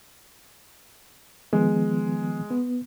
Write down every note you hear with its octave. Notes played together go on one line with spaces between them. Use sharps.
D#3 F3 G#3 B3
B3